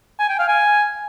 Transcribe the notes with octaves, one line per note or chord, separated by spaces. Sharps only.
G#5
G5
F5
G#5